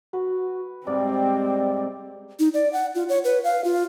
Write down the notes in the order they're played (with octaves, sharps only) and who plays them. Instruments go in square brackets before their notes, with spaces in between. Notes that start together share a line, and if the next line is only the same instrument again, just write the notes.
[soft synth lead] F#4 [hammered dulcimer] B4
[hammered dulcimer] G#2 C3 G3 [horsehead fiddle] C4 [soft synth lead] D5
[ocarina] D#4
D5
F#5
F4
C#5
B4
F5
F4